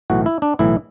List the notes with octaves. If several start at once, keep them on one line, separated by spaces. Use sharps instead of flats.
B1 A2 E3 F#4
E4
D4
B1 A2 E3 E4